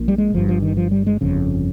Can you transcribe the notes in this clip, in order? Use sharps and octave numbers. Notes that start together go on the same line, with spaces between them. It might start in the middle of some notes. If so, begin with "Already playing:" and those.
Already playing: A#1 A#2
G3
G#3
G1 G2 F3
F3
D#3
F3
G3
G#3
G1 F2 C#3